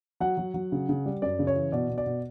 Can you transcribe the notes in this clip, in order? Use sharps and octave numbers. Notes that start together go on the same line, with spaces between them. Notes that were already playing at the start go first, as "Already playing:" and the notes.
F#3 F#5
F#3
F#3
C#3
C#3
G3
F#2 D5
C#3
C#5
E3
B2 D5
B2
D5
B2